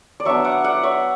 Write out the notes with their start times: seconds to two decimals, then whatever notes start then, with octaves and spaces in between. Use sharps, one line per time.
0.20 D5
0.25 F#3 B3 D4 C#5 E5
0.44 D5 F#5
0.64 D5 F#5
0.83 C#5 E5